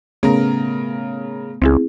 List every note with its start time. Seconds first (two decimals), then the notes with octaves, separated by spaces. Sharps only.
0.23 C#3 A3 B3 A#4
1.62 C#2 C4 E4 G#4